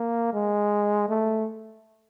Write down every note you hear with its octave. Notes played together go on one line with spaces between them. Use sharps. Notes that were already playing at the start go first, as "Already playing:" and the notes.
Already playing: A#3
G#3
A3